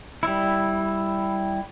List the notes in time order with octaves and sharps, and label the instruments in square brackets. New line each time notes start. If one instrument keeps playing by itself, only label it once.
[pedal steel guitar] G3 E4